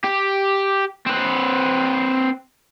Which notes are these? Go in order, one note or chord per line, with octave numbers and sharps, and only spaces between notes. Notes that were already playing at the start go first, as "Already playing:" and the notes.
G4
C4 B4